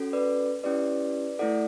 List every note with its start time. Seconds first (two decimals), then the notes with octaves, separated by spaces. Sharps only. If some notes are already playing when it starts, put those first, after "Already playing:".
Already playing: C#4 F#4 A4
0.13 B4 D5
0.63 C#4 E4 G4 B4 D5
1.39 A3 E4 A4 D5 F#5